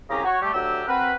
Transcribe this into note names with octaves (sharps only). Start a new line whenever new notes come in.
C2 C#3 G4 G#4 A#5
F#4 C#5
G3 A3 G4
D2 F#3 D4 G4 E5 E6
C4 F#4 A#4 B4